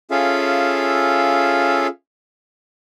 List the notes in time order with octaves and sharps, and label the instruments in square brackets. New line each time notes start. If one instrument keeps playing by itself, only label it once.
[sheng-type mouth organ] C#4 F4 G#4 A4 E5 F5